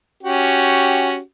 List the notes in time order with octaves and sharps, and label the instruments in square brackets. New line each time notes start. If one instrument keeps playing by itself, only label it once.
[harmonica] C#4 F#4 G4